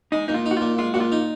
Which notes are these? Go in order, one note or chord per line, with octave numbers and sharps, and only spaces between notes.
G#3 D#4
A#2 D#4
F4
D#4
F#4
A#2 F4
G#3 F4
A#2 F#4
F4
D#4